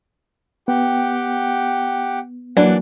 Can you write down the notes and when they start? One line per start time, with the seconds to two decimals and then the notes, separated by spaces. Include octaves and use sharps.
0.68 B3 G4 F#5 G5
2.57 E3 F#3 A#3 D4 F#5